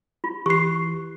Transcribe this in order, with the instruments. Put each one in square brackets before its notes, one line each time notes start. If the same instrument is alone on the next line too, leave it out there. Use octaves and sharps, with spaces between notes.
[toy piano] F4
[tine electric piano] E3 C6 F#6 [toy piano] G4 [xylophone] C#6 C7